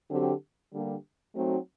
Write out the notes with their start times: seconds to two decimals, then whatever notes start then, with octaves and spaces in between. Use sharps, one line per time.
0.10 D3 F#3 C4 G4
0.73 D3 G3 A#3 D4 G4
1.35 F#3 A3 C4 D#4 F#4